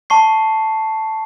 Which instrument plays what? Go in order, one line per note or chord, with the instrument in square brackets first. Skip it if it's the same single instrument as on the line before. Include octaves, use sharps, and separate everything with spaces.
[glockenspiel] A5 C#6 C7